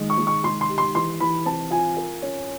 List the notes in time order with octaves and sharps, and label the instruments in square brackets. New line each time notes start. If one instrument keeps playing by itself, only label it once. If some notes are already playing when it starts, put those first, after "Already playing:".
Already playing: [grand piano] D#3 G#3
[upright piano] C#6
[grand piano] G#3
[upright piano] C#6
[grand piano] G#3 [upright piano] C6
[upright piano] C6
[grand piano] G4
[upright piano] C6
[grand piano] E3 [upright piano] C6
[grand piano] E3 [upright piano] B5
[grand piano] C4 [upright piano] A5
[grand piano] F4 [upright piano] G#5
[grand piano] A#4
C#4